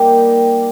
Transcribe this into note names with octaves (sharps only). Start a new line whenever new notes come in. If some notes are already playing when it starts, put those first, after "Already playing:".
Already playing: G3 A#3 D#4 G4